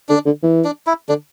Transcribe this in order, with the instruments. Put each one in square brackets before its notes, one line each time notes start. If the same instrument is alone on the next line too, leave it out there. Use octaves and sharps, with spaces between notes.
[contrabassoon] D3 [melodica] D4
[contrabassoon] D3
E3
[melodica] D4
E4
[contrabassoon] D3 [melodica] D4